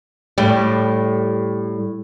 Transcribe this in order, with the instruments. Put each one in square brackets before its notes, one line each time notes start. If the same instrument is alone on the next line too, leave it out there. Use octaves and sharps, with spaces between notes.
[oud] A2 G3